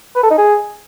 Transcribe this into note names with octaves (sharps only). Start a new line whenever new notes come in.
B4
A4
D#4
G#4